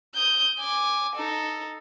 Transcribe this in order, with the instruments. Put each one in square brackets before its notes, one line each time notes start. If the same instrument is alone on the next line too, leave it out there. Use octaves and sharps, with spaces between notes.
[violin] D#6 G6
G#5 D6
D#4 A4